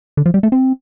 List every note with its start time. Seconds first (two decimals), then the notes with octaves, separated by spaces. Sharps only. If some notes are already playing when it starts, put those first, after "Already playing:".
0.17 D3
0.26 F3
0.34 G3
0.43 A3
0.52 C4